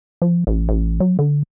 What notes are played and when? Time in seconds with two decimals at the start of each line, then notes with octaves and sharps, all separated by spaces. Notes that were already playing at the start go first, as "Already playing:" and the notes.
0.22 F3
0.47 A1
0.69 A1
1.00 F#3
1.19 D3